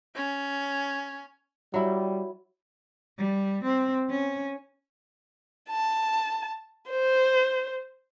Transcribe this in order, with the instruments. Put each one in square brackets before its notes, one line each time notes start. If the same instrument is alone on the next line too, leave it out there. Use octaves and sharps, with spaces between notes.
[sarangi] C#4
[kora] F#3 E4 [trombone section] G3
[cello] G3
C4
C#4
[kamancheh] A5
C5